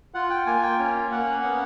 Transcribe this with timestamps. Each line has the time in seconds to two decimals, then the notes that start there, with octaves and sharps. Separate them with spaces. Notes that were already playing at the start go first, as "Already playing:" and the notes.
0.14 F4 F#5
0.30 G5
0.46 A#3 G#5
0.63 G5
0.79 C#4
1.11 A#3 F#5
1.44 B3